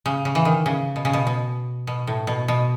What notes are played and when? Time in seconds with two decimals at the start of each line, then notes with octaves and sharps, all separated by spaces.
0.06 C#3
0.25 C#3
0.35 E3
0.45 D#3
0.66 C#3
0.96 B2
1.05 C#3
1.13 B2
1.27 B2
1.87 B2
2.07 A2
2.27 B2
2.48 B2